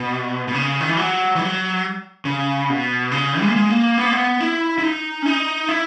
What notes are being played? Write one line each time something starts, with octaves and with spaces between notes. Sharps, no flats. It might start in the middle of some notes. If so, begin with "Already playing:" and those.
Already playing: B2
B2
C#3
D#3
E3
F#3
E3
F#3
C#3
B2
C#3
G#3
A#3
G#3
A#3
B3
A#3
B3
E4
E4
D#4
C#4
D#4
E4